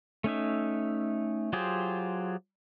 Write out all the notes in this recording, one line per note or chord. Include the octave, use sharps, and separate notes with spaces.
A3 C#4 D#4 E5
F#3 F4 G4 G#4 C5